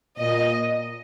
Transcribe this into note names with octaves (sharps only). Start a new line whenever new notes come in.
A#2 D#5